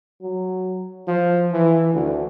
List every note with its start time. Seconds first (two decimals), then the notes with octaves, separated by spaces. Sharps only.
0.22 F#3
1.07 F3
1.52 E3
1.94 D2